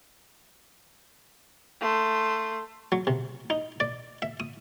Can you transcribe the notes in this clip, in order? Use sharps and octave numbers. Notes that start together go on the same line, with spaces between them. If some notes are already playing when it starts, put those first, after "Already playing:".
A3 C6
F#3
C3
D#4
D5
E5
D#6